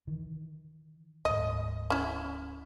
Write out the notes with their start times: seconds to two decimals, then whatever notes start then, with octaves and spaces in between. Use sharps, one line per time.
0.07 D#3 E3
1.25 D1 G#2 D#5
1.90 C#4 E4